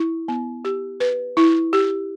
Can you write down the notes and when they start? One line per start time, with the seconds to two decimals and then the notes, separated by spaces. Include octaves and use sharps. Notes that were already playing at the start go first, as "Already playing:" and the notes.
Already playing: E4
0.28 B3
0.65 G4
1.00 B4
1.37 E4
1.73 G4